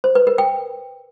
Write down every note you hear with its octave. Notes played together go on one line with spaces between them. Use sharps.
C5
B4
A#4
G5